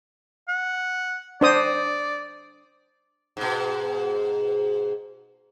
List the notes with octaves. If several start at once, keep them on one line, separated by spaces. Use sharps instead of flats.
F#5
D4 C5 D5 D#6
G#2 B2